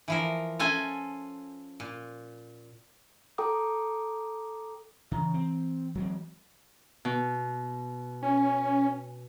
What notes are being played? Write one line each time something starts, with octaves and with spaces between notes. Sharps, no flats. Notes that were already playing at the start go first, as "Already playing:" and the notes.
E3 F3 A#4
C#4 F4 A4 G#5
A#2
A4 G5 A#5 D6 D#6
C#3 E3 A#5
C4
F#3 G#3 C4
B2
C#4 G#5